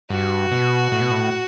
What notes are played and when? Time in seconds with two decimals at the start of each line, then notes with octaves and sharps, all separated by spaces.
0.10 G2 F#4
0.51 B2
0.92 A2
1.01 B2
1.11 A2